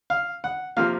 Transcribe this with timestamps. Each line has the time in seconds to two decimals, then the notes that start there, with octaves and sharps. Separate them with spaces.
0.10 F5
0.44 F#5
0.77 C3 F3 A#3 F5